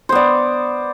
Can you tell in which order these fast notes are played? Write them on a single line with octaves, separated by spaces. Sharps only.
C5 B3 D5